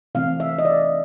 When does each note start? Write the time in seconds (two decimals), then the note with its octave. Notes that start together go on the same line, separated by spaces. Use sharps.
0.15 C3 E3 A3 C4 F5
0.40 E5
0.58 D#5
0.65 D5